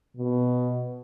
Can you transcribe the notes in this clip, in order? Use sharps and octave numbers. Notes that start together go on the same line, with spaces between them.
B2